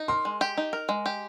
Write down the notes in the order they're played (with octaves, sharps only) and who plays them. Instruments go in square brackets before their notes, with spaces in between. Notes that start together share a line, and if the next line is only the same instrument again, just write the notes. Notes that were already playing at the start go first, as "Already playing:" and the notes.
Already playing: [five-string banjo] D#4
[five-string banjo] A#4 [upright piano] C6
[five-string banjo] G#3
G4
D#4
A#4
G#3
G4